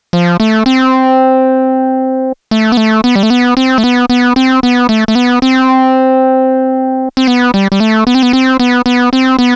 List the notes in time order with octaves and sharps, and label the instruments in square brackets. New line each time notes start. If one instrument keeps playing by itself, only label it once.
[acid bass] F3
A3
C4
A3
B3
A3
B3
G3
A3
B3
C4
A3
B3
B3
C4
B3
A3
A3
B3
C4
C4
B3
G3
G3
A3
B3
C4
B3
C4
B3
B3
C4
B3